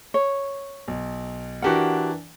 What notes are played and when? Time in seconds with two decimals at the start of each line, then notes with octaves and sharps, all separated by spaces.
0.14 C#5
0.88 B1
1.62 E3 D4 F#4 G4 A#4 F#5